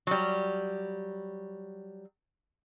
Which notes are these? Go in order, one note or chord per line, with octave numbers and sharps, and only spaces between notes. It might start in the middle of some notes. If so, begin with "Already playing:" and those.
F#3 G3